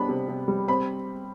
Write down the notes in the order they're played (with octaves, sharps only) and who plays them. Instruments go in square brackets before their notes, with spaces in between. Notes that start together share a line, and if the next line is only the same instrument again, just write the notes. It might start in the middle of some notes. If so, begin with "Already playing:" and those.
Already playing: [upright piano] G3 B3 D4 B5
C3
C3
G3
C4 B5